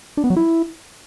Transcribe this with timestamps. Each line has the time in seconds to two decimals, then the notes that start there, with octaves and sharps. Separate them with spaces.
0.17 D4
0.24 B3
0.30 F#3
0.37 E4